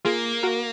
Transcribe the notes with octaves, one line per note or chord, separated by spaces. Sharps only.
A#3 F4 G#4
F#4 A#4